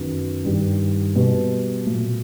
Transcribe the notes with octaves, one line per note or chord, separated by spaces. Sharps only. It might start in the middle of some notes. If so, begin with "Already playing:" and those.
Already playing: F#2 D#3 F#3 B3
G2 D#3 G3
B2 G3 B3
A#2 F#3 A3